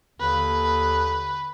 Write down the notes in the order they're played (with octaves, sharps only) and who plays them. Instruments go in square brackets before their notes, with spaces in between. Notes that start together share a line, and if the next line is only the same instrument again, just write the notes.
[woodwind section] D#2 D3 [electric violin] B4